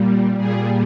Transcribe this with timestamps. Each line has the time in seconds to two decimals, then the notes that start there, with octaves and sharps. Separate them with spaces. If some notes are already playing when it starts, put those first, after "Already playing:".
Already playing: A#2 G3
0.37 A#2 G3 G#4